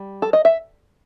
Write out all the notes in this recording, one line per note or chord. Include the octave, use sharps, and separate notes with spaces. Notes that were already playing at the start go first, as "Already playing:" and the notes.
Already playing: G3
A4
D#5
E5